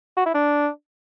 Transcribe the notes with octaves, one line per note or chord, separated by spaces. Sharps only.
F#4
E4
D4